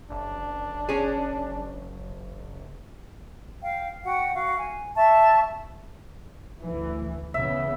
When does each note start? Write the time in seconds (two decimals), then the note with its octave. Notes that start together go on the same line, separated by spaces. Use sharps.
0.11 F#1 D4
0.89 C#4 G#4
3.61 F5 G5
4.05 F#4 F#5 G5
4.35 F#4 F5
4.58 G#5
4.95 E5 A5 C#6
6.62 D2 E3
7.34 C#3 E3 B3 E5